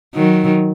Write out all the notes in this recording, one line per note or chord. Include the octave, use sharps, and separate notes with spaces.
D#3 F#3